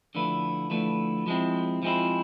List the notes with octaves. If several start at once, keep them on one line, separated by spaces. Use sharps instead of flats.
D3 F3 A3 E4 B4
D3 F3 A3 E4 B4
F3 G#3 C4 E4
F3 G#3 C4 E4